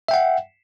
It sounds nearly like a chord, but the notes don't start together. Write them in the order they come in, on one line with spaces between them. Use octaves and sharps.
E5 G5 F#5